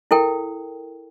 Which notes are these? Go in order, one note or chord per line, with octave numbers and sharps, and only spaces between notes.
E4 A4 A#4 G5